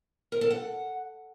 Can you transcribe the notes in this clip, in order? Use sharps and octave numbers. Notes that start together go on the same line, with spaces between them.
A#4
A4
F#5